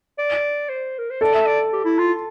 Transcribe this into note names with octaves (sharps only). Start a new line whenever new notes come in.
D5
C5
A#4
C5
A4 D5
E5
D5
G4
E4
F4